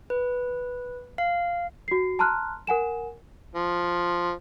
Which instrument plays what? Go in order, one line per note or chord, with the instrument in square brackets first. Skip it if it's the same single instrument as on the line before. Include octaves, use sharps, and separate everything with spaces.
[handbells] B4
F5
[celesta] F#4 C7
A5 A#5 C6 F6 F#6
A#4 F#5 G#5 E7
[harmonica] F3